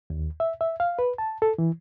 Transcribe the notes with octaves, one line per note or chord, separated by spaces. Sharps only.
D#2
E5
E5
F5
B4
A5
A4
E3